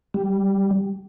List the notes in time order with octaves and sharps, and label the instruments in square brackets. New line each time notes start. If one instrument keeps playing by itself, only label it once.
[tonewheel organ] G3